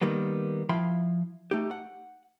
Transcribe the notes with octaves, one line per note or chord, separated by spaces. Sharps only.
D#3 G3 A#3 B3
F3 E4 F5 G5 B5 C6
A3 D#4 G4
F#5